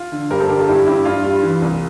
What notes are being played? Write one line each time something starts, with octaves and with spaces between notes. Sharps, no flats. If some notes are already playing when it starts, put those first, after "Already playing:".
Already playing: F4
D3
G2 G4 A#4
A4 C5
D3 G4 A#4
F4 A4
G2 E4 G4
G2 E4 G4
G2 F4
G3 F4
E3
C2